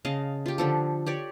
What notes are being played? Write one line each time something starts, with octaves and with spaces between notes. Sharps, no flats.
C#3 D#5 F5 A5
F4 G4
D3 F3 A4
G4 C#5 D5